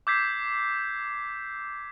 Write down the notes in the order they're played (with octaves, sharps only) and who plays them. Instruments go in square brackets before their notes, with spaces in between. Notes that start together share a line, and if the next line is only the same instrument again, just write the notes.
[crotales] D6 E6 G6 G#6 B6 C7